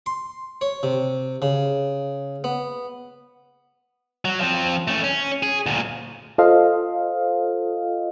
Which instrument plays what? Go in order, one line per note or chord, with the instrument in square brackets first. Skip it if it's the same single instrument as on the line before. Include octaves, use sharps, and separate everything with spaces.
[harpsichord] C6
C#5
C3
C#3
B3
[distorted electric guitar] F#3
F3 C4
A3 C#4
C#4
G#4
D2 A#2
[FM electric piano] F4 A4 C5 D#5 F5